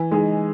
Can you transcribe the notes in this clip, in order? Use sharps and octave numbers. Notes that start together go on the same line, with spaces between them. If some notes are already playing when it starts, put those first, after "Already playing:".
Already playing: E3
G#3 D#4 G#4